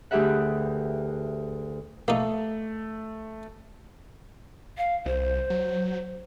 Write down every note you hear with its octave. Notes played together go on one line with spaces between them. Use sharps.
D2 G4 G#4 B4 E5 F#5
A3 A#3 D#4
F5
C2 C5
F#3